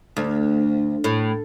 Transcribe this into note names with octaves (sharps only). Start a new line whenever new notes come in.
D2
A2